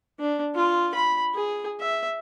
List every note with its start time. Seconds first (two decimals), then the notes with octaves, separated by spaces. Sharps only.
0.20 D4
0.55 F4
0.94 B5
1.35 G#4
1.80 E5